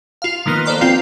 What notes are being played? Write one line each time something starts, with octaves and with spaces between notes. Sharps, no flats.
F4 F5
D#3 F3 A#3 B3 C#7 D#7
A4 B4 C5 D5 A#5 C6
C4 F4 G5